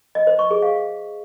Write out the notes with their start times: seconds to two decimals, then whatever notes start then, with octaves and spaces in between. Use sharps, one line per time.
0.15 D#5
0.27 C5
0.39 C#6
0.51 G#4
0.62 F5